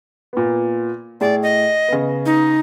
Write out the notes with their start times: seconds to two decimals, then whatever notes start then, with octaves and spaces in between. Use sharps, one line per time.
0.33 A#2 B3
1.21 A2 G#4 D5
1.43 D#5
1.88 C#3 B3
2.26 D#4